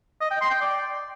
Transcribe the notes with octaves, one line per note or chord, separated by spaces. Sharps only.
D#5
G5
C6
G5
D5